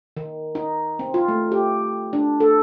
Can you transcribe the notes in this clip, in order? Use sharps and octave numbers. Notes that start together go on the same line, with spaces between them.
D#3
D#4
C4
F4
A3
G4
D4
A4